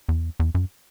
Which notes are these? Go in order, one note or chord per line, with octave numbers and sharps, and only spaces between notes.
E2
E2
F#2